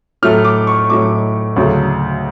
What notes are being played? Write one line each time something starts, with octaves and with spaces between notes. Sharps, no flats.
A2 F#3 A3 F6
D6
C#6
A2 F#3 A3 D6
D2 C#3 F#3 A3